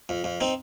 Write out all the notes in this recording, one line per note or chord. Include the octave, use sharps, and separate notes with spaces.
F2
F2
C4 D#4